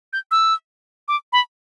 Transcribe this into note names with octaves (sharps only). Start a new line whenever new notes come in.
G6
E6
D6
B5